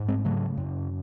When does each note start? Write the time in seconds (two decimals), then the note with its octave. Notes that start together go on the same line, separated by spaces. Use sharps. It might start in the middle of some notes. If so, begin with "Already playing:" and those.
Already playing: G#2
0.08 G#3 C4
0.25 C#3 F#3 A3
0.57 F#2